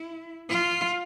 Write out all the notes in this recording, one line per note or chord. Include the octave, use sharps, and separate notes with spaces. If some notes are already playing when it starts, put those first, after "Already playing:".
Already playing: E4
F4